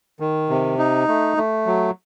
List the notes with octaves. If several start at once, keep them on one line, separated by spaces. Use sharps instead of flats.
D#3
C3
D#4
A3
A3
F#3